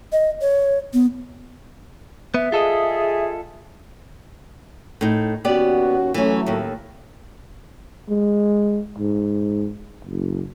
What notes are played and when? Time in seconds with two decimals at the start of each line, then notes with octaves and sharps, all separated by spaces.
0.12 D#5
0.41 C#5
0.93 B3
2.34 B3 E5
2.52 F4 G#4 A4 D#5
5.01 A2 D#4
5.45 D#2 B3 C#4 F#4 G4 D5
6.14 E3 F#3 A3 C#4
6.46 D#2 A2
8.09 G#3
8.98 G#2
10.05 F#1